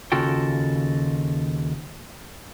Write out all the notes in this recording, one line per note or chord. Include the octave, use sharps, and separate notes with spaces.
D#2 C#3 F4 F#4 A4 G5